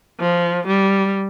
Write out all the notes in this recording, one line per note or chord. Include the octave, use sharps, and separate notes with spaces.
F3
G3